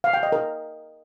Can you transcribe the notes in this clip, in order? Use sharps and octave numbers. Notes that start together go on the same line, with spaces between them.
F5
G5
D#5
A#4